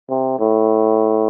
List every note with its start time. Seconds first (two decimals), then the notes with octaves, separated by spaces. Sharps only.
0.09 C3
0.39 A2